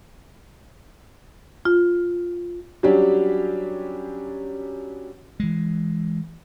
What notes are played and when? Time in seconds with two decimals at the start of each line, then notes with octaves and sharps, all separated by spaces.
1.65 F4
2.83 F#3 G3 C#4 D4 G4
5.40 E3 G#3